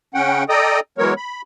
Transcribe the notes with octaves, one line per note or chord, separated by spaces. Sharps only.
C#3 C#4 F#5 G5
A4 D5 D#5 G5 A#5 D#6
E3 F#3 G#3 B3 A#4 C#5
B5